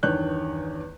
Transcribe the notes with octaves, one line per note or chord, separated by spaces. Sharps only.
E2 G2 D#3 C#5 F#6 G6